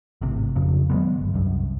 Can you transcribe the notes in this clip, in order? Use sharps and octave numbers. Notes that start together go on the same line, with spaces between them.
G#1 A2 C3
F2 C#3
D#3 F#3 G#3 B3
G1
C2 F#2